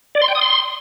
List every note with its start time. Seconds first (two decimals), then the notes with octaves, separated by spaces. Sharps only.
0.15 D5
0.22 C6
0.28 G5
0.35 D#6
0.41 C6